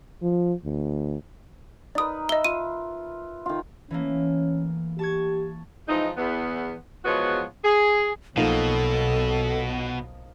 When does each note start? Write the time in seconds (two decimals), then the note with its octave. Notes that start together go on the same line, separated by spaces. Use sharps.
0.22 F3
0.65 D2
1.95 D#4 A#4 B4 D5 D#6
2.29 D#5 E5 G7
2.44 F4 D#7
3.46 D#3 F4
3.91 E3 A3 A#3 C#4
4.99 G4 A5 C#6 G#6
5.88 E3 F3 G#3 D#4
6.17 E2 B3
7.05 E2 F3 G#3 B3 F#4 C#5
7.65 G#4
8.37 B1 B2 F3 A#3 D#4 A4